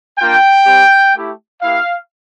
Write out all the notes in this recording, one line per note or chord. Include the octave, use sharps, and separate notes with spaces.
A#3 D4 F4 G5
G3 C4 G4
A3 E4 G4
A#3 E4 G4 F5